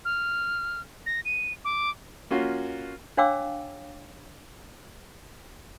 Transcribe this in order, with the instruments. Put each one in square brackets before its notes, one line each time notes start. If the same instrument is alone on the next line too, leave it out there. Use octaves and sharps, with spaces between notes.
[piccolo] F6
A#6
D#7
D6
[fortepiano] A#3 C#4 F4 F#4
[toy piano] D4 C#5 F5 G5 D6 E6